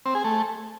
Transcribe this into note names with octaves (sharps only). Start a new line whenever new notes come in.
C4
G#4
A3